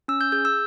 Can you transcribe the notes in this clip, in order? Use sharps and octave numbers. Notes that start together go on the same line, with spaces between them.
C#4 E6
G6
G#4 G6
E6